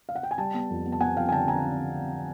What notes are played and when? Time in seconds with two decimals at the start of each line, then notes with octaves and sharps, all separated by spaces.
0.09 F5
0.15 F#5
0.23 G5
0.31 G#5
0.38 G3 G5 A5
0.54 B3
0.70 F2
0.86 B3
0.92 A5
1.00 B3 F#5 G#5
1.17 F2 F5 G5
1.29 G#5
1.32 D3 G5 A5
1.48 D3 G#5 A#5